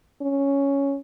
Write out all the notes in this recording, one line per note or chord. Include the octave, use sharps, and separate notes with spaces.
C#4